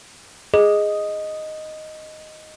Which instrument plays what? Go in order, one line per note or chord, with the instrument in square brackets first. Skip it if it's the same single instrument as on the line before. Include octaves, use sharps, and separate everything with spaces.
[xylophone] G#4 [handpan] D#5